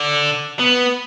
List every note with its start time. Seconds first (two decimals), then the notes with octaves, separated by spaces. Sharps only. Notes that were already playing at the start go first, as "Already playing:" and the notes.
Already playing: D3
0.60 B3